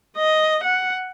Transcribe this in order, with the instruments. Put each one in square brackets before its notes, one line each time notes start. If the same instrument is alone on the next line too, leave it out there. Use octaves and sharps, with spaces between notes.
[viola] D#5
F#5